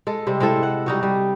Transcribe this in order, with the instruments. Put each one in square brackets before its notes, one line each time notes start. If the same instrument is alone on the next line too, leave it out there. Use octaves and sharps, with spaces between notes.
[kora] G#3 A4
C3 G3 C4
G#3 C4 E4 A4
F#5
G3 D#4 F#4
G3